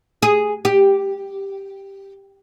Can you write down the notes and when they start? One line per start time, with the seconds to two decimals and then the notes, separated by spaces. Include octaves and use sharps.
0.22 G#4
0.65 G4